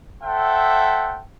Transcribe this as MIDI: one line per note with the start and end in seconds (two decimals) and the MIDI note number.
0.22 1.19 69
0.22 1.19 72
0.22 1.19 76
0.22 1.19 78
0.22 1.19 79